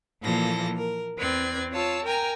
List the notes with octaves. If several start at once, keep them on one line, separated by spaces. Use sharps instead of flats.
A#2 E3 F3 A#3 A4 A#6
A#4
E2 C4 B4 D5 G#6
F4 C#5 A5 E6
A#4 G5 G#5 A#5